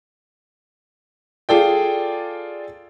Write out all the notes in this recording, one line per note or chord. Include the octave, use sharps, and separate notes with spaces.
F4 G#4 A4 D5 G5